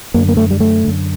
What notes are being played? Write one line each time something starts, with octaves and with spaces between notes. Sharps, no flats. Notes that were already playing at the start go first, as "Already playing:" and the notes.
F#2 D3 A#3
A#3
A3
G3
A3
F#2 D3